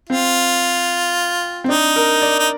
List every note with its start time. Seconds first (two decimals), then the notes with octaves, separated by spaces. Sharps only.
0.09 C4 F4
1.64 C4
1.69 D4 D#4
1.96 A#4
2.22 D5
2.39 D#4